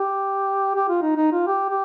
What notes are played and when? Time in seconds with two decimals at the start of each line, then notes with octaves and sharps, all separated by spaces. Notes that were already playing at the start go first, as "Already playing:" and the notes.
Already playing: G4
0.76 G4
0.89 F4
1.02 D#4
1.17 D#4
1.32 F4
1.47 G4
1.70 G4